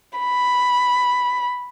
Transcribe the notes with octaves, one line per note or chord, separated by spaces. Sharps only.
B5